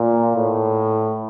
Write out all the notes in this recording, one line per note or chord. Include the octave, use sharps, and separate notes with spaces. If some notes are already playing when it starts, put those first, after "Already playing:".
Already playing: A#2
A2